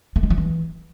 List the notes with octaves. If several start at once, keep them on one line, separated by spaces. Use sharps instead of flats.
A3
G#3
F3
E3